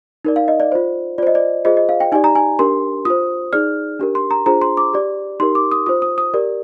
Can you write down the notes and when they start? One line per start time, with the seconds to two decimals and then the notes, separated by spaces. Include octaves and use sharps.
0.25 D#4 A#4 D5
0.36 F5
0.48 D#5
0.60 D5
0.72 F4 C5
1.18 F4 D5
1.23 C5 D#5
1.35 D5
1.65 F4 G#4 C5 D#5
1.77 D#5
1.89 F5
2.00 G5
2.12 D#4 G4 D5 G#5
2.24 A#5
2.35 G#5
2.59 D4 G4 A#4 C6
3.05 F4 C5 D#6
3.53 D#4 G#4 D5 F6
3.99 D4 G4 A#4
4.15 C6
4.31 A#5
4.46 D4 F4 G#4 C5 A#5
4.61 C6
4.77 D6
4.93 G4 D5
5.40 D#4 G4 A#4 C6
5.55 D6
5.71 D#6
5.86 F4 C5 D#6
6.02 D#6
6.18 D#6
6.34 G4 A#4 D5